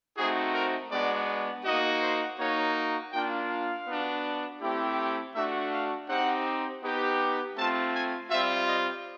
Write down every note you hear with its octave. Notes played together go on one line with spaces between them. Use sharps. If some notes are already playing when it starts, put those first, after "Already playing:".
A3 C4 D#4 F#4 G#4
A#4
G#3 B3 D4 F#4 D5
A#3 D#4 F#4 D#5
C5
A#3 D#4 F#4 C#5
A#3 D4 F4 G5
F5
B3 D4 F#4
A3 C4 E4 G4
A3 D4 F#4 E5
F5
C4 D#4 G4 F#5
B3 D#4 G4
A3 C4 F4 A5
G#5
G3 C4 F4 E5
D#5